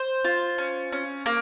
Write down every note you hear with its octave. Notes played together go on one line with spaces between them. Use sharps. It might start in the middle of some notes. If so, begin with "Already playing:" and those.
Already playing: C5
F4
C#4
C#4
A#3